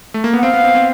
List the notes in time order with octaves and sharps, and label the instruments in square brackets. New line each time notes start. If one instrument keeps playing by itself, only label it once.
[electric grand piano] A3
A#3
[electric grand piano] B3 [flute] F#5
[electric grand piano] C4 [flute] F5
[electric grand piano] B3
C4
C4